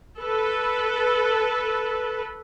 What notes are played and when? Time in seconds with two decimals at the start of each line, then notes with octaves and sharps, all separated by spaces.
0.18 A4 B4